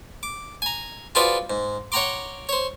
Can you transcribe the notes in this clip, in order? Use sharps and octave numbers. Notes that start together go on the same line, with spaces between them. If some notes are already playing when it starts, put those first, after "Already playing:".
D6
G#5 A#5
F4 F#4 G#4 B4 C5 D5
G#2
C#5 F#5 G5 A#5 C6 D6
C5 C#5